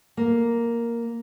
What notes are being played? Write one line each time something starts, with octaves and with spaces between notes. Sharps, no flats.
A#3